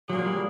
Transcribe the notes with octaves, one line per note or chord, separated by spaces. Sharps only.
F#3 A#3 D4 F4 G#4
G3